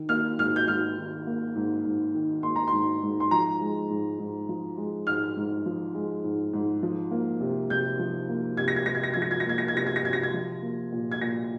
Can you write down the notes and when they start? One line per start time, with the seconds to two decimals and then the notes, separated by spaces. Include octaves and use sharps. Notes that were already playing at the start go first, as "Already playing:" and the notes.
Already playing: D#3
0.09 A#3 F6
0.38 G#2 F6
0.56 G6
0.67 G#2 F6
0.97 D#3
1.27 A#3
1.55 G#2
1.85 G#2
2.14 D#3
2.43 A#3 C6
2.56 A#5
2.67 G#2 C6
3.03 G#2
3.20 C6
3.31 F3 A#5
3.61 G#3
3.90 G#2
4.19 G#2
4.49 F3
4.77 G#3
5.07 G#2 F6
5.36 G#2
5.66 F3
5.94 G#3
6.24 G#2
6.53 G#2
6.83 F3
7.11 A#3
7.41 C3
7.70 C3 G6
7.99 F3
8.29 A#3
8.57 C3 G#6
8.68 A#6
8.76 G#6
8.86 C3 A#6
8.95 G#6
9.03 A#6
9.14 F3 G#6
9.22 A#6
9.31 G#6
9.40 A#6
9.46 A#3 G#6
9.58 A#6
9.68 G#6
9.75 C3 A#6
9.87 G#6
9.96 A#6
10.05 C3 G#6
10.13 A#6
10.23 G#6
10.34 F3
10.62 A#3
10.92 A#2
11.12 G#6
11.21 A#2 A#6